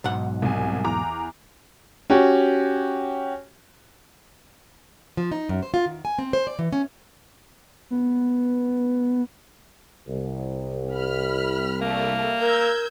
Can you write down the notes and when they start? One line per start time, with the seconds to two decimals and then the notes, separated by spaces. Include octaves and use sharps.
0.04 B1 G#2 F#5
0.42 C2 G#5
0.84 E2 A#5 D6
2.10 C#4 F#4 G4
5.17 F3
5.32 D#4
5.49 F#2
5.62 C5
5.74 F4
5.86 D#3
6.05 G#5
6.19 C4
6.33 C5
6.47 D5
6.59 E3
6.73 C#4
7.91 B3
10.07 C2
10.93 B5 F6
11.81 G3 A3 A#3
12.40 A#4 E6 G6 G#6